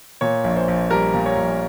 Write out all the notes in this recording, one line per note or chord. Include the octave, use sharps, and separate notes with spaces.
A#2 C#5
A#1
C5
A#1
G3 A#4
A#2
C#5
A#1